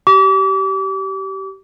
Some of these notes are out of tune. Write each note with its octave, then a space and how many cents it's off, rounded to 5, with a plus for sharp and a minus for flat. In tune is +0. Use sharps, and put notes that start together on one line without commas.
G4 -25 D6 -35